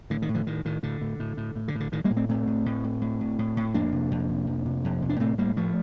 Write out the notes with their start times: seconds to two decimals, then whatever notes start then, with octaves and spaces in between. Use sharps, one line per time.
0.10 A2 D3
0.22 D#3
0.29 A2
0.34 D3 F3
0.47 A2 D#3
0.65 A2 D#3
0.83 A2 D3
1.01 A2
1.20 A2
1.37 A2
1.56 A2
1.68 D3
1.75 A2
1.80 D3
1.92 A2 D#3
2.04 G3 A#3
2.10 A2
2.16 A3 C4
2.29 A2 A3 C4
2.47 A2
2.66 A2
2.84 A2
3.01 A2
3.21 A2
3.39 A2
3.57 A2
3.74 F2 A#3 D4
3.92 C3
4.11 F2
4.29 C3
4.47 F2
4.66 C3
4.84 F2
5.02 C3
5.09 D4
5.20 A2 A3 C4
5.38 A2 G3 A#3
5.56 A2 F3 A3